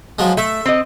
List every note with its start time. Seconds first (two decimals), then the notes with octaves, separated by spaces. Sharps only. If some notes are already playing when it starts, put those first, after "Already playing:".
0.19 F3 F#3 G#3
0.37 A3 E5
0.66 C4 D#5